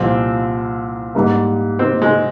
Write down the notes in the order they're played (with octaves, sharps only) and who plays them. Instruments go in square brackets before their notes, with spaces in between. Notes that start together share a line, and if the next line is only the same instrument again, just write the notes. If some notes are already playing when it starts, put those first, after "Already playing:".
Already playing: [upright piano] C2 A#2 F3 [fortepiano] C4
[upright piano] G#2 G3 A#3
[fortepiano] C4
G#3